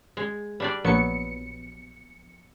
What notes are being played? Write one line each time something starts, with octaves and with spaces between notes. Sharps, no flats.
G#3
G3 D4 D5
A#1 F#3 B3 C#7